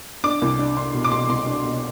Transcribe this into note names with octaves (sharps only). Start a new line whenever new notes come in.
D4 D6
C2
D4
D4 C6
B2
D6
B2 C6
C2 C6
D4
B2